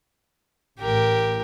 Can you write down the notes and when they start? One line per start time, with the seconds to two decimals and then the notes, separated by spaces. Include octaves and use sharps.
0.80 A1 G4 A#4